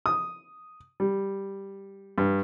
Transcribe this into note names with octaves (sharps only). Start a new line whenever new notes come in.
D#6
G3
G2